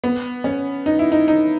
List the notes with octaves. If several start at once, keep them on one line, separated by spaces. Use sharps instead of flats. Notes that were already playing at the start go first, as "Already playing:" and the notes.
B3
C#4
D#4
E4
D#4
D#4